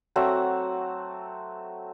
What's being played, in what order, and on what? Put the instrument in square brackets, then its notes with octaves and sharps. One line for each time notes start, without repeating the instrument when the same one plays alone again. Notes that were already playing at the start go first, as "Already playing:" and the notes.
[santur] F#3 A3 C4 F#5